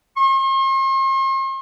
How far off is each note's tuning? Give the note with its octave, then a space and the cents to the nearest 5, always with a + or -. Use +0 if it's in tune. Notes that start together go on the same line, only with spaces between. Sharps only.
C6 +45